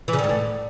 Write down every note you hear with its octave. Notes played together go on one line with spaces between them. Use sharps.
E3
C#3
D#3
G#2
A2